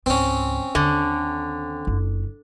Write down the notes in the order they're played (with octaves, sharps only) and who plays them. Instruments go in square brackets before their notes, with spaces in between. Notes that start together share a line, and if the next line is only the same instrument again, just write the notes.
[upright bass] C#2 G#2 [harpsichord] C4 C#4
[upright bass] D#2 [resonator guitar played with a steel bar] D3
[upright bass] F#1 F4